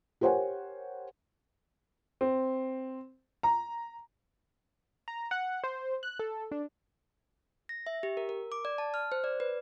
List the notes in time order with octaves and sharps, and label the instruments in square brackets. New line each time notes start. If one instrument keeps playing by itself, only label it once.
[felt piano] G4 A#4 C5 C#5 F#5 G#5
[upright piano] C4
A#5
[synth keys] A#5
F#5
C5
F#6
A4
D4
[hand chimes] A#6
E5
G4
A#4
A#4
D6
D5
A5
F6
C5
D5
B4